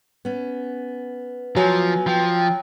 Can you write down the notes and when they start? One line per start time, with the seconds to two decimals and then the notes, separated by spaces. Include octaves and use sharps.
0.25 B3 C#4
1.57 F3 F#3 G#5
2.07 F3 G5